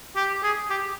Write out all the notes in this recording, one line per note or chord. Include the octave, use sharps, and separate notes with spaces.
G4
G#4
G4